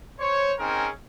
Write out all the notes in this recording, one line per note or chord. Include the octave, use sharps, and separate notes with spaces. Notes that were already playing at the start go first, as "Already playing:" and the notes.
C5 C#5
C4 C#4 D#4 G#4 A#4